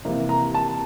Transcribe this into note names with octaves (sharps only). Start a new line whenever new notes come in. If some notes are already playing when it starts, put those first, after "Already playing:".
C3 E3 A#3
A#5
A5